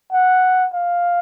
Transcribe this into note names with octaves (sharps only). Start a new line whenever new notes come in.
F#5
F5